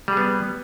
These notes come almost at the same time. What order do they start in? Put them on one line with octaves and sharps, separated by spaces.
G3 G#4 B3